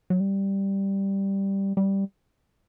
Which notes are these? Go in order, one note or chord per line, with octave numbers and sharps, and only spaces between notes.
F#3
G3
G3